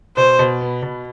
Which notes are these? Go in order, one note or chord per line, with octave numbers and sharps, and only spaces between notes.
B2 C5
B2
B3
B2